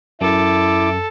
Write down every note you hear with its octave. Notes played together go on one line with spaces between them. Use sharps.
F#2 E4 A4 D6